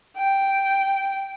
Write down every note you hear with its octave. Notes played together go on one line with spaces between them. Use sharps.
G5